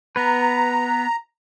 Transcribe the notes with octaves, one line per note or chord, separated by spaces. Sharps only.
B3 B4 A#5